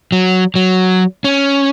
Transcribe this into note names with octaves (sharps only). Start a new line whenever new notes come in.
F#3
F#3
C#4